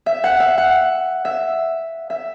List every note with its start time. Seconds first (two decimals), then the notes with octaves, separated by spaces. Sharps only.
0.06 E5
0.24 F#5
0.40 E5
0.58 F#5
1.25 E5
2.10 E5